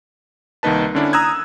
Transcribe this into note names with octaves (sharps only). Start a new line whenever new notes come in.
C2 D#3 A#3 D#4 B4 A5
D3 C#4 D4 E4
A#5 D#6 E6 F#6 G#6